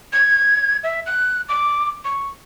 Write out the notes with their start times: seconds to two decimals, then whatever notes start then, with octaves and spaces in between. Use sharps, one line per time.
0.13 G#6
0.83 E5
1.06 F#6
1.49 D6
2.05 C#6